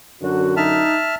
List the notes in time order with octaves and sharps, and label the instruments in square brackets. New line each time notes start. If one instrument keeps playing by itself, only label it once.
[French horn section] F#2 D3 [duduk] F#4
[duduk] D#4 [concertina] E5 A5 F6